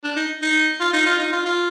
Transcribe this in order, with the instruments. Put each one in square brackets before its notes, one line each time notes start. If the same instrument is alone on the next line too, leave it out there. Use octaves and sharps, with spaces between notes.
[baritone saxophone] D4
D#4
D#4
F4
D#4
F4
D#4
F4
F4